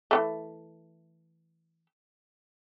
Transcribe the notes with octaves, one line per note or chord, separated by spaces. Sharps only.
E3 G#3 A3